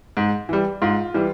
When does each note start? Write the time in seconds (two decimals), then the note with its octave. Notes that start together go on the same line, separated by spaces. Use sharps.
0.17 G#2
0.49 E3 G3
0.82 G#2 F4
1.14 E3 G3